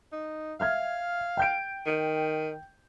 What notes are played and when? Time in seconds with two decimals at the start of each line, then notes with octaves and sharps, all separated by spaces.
0.12 D#4
0.60 E5 F5 F6 G#6
1.37 G5 G6 D7
1.86 D#3